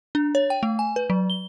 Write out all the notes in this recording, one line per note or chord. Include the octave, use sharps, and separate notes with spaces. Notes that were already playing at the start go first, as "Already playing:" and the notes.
D4
C#5
G5
A3
G#5
B4
F#3
G7